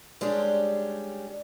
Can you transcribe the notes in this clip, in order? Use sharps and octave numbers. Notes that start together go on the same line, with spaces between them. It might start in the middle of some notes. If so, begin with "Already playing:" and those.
G3 G#3 C#4 D4 G4